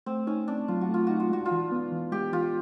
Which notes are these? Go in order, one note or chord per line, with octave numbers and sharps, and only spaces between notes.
A3 C4
C#4 D#4
C4 D4
F#3 F4
F#4
A3 F4
D#4 F#4
F4
G#3 F#4
F4
E3
B3
E3
G#3 G4
E3 F4